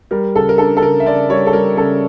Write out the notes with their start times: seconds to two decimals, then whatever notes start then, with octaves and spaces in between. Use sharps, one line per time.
0.11 G3 A#4
0.35 C#3 A4
0.49 A#4
0.58 D4 A4
0.77 A4
0.82 C#3 A#4
1.00 E5
1.06 C#3 D5
1.30 G3 C#5
1.47 A4
1.53 G3 A#4
1.77 C#3 A4